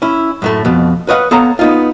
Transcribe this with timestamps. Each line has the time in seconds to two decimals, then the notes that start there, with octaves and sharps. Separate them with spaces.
0.02 C#4 E4
0.42 F#2 A2 A3
0.65 F2 B2
1.08 B4 C#5 D#5 F5 F#5
1.31 B3 A4 C#5 F5 A#5
1.59 B3 D#4 F4